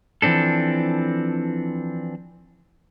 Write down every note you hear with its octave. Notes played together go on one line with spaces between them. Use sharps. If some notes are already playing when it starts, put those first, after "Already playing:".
E3 F3 C4 D4 A4